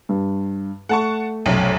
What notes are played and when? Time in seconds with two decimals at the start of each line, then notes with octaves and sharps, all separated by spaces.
0.09 G2
0.89 A3 F#5 A5 C#6
1.46 F1 B1 F#2